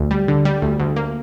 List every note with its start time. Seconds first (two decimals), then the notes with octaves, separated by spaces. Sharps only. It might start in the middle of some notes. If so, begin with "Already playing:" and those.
Already playing: D2
0.11 G3
0.28 D3
0.45 G3
0.62 D2
0.80 D2
0.96 A#3